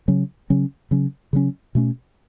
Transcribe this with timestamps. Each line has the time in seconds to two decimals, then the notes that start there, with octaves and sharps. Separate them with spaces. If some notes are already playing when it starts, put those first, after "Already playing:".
0.08 C#3 F#3 C#4
0.50 C#3 F#3 C#4
0.91 C#3 F#3 C#4
1.33 C#3 F#3 C#4
1.75 B2 A3 C#4